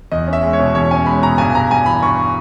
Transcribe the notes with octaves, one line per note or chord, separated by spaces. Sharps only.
E2 D#5
C#4
E5
G#3
C#5
B2
E2 C#5
C#4 G#5
G#3 B5
B2 A#5
G2 G#5
G2 A#5
G3 G#5
E3 B5
G2 C#6